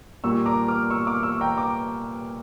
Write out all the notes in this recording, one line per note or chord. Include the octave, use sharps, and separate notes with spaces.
A#2 G3 C#6 E6
A#5 D6
D6 F6
C#6 E6
D6 F6
C#6 E6
G5 A#5
A#5 D6